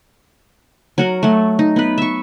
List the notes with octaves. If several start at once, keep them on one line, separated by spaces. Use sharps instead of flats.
F#3 F#4 A#4
F#3 A3
D#4
B3 B4
E5 C#6